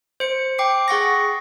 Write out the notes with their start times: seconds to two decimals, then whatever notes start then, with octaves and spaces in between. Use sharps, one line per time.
0.20 C5 C#7
0.59 G5 D6 C7
0.88 G#4 F#5 C#6 A#6